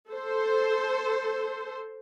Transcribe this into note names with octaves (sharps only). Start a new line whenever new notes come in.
A4 C5